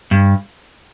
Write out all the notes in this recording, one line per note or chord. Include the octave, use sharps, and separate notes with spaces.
G2